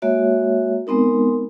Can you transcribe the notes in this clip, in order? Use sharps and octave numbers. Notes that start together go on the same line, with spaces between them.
G#3 A#3 F#4 C#5 E5
G#3 B3 C4 D#4 A#4